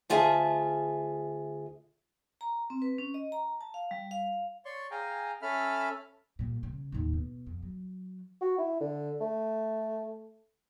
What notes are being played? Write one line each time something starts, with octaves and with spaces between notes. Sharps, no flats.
D2 F4 G#4 E5 A5
A#5
C4
B4
C#4
D#5
A#5
A5
F5
G3
F5
C#5 D5 C6 C#6
G#4 F5 G5 G#5 A#5
C#4 A4 E5 B5 F6
A#2 G3
C#3
D#2 A2
B2
F2
F#3
F#4
E4
D3
A3